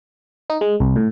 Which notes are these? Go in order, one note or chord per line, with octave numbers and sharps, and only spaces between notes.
D#4
G#3
C2
A2